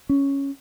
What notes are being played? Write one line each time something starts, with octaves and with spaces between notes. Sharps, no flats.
C#4